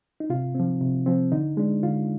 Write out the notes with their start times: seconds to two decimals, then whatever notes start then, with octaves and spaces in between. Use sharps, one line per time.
0.20 D#4
0.30 C3 F4
0.55 F3 C4
0.81 C3
1.06 F3 C4
1.32 D3 D#4
1.57 G#3 D4
1.83 D3 F4